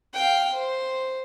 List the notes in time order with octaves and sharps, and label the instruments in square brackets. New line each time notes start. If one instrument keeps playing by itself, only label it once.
[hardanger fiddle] F5 G5
C5